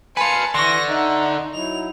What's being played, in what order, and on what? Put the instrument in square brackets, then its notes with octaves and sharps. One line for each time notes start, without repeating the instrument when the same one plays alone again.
[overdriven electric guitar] B4 F5 [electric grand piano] G#5 C6 [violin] A5 C#7
[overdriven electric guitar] D3 [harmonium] E3 [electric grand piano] C6 C#6 [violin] A#6
[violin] D#4 [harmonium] E5 F#5 A#5
[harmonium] F#3 D#4 E4 [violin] F7